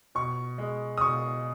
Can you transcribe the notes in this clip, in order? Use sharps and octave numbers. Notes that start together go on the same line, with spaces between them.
B2 C#6
G#3
D#6
B2 C#6